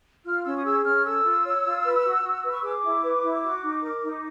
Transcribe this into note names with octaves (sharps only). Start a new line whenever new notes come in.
F4 F6
C#4 E6
D#6
G#4 E6
C#4 F6
A4 E6
F4
C#5
F4
B4
F#4
F#4
B4
C#6
G#4 D6
E4
B4
E4
F#4
D#4
A#4
D#4